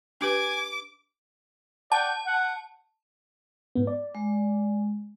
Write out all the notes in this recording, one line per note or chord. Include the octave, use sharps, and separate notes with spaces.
D4 G4 B4 G#5 D6
D5 F#5 G5 A5
F#5
G#2 B3
D5
G#3